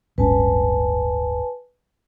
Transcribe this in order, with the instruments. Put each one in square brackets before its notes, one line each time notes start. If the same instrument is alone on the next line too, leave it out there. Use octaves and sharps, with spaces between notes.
[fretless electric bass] D1 G1 C#4 [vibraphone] B4 G#5 A5